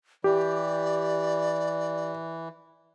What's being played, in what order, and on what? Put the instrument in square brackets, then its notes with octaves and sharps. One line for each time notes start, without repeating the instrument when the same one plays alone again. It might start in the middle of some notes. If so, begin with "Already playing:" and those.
[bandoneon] E3 [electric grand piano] G4 [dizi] D5